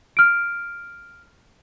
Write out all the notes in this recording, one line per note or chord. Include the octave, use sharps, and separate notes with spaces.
F6 D7